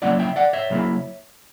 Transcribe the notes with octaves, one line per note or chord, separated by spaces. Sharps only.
C#3 F#3 A#3 C#4 E4 D5 F#5
E5 G5
D5 F#5
C#5 E5
C#3 F#3 A#3 C#4 E4